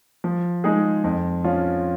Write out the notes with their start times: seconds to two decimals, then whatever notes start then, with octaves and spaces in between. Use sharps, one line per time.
0.24 F3
0.64 G#3 D#4 G#4
1.04 F2
1.44 F3 C#4 F4